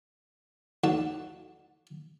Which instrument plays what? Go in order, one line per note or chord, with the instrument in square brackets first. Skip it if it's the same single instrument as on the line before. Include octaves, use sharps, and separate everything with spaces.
[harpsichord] D#2 D3 F#4 A4 A5